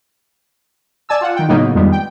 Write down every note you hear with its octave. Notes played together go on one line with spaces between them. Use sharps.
D5 G#5 A5 E6
F4 F#5
D#3 G5
A2 C#3 F#3 A#3 B3 D#4
F2 D#3 G3 G#3 B3
G5